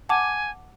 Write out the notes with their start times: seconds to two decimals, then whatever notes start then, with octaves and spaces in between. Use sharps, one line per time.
0.09 F#5 G#5 A5 D6